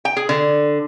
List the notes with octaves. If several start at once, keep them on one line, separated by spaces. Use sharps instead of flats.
G5
G#4
D3